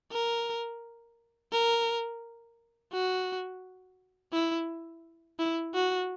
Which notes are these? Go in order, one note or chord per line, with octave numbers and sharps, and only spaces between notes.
A#4
A#4
F#4
E4
E4
F#4